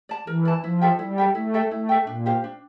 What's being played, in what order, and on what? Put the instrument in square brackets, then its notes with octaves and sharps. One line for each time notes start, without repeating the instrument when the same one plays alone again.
[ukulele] D5 A5
[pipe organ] E3 [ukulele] A#4
[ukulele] D5 A5
[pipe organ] F3 [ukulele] E4
[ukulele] A4 E5 G5
[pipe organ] G3 [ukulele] E4
[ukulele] A4 E5 G5
[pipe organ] A3 [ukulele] E4
[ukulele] A4 E5 G5
[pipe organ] A3 [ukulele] E4
[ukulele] A4 E5 G5
[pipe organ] A#2 [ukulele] D4
[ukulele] G4 C5 F5
D4